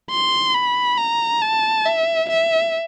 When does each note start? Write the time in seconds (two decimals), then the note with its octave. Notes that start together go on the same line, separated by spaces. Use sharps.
0.11 C6
0.54 B5
0.97 A#5
1.42 A5
1.86 E5
2.29 E5